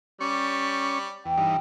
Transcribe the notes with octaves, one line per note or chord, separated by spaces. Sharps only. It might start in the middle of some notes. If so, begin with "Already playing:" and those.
G3 C#4 C#6
E2 G5
G2 E3 D#4